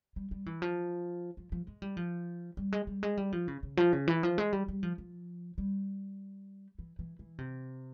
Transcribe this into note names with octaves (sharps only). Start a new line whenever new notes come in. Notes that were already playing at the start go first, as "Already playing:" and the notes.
G3
G3
E3
F3
F3
F3
G#3
G3
F3
G3
G#3
G3
G#3
G3
F3
C#3
C#3
F3
C#3
E3
F3
G#3
G3
G3
F3
F3
G3
E3
E3
E3
C3